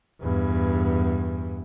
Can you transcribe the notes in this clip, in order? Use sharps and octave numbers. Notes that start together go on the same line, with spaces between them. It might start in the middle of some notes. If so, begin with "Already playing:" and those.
E2 G2